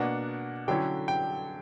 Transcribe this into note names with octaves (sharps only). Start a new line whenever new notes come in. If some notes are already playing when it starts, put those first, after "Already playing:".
Already playing: B2 A#3 D4 F#5
D3 F#3 C#4 E4 G5
G5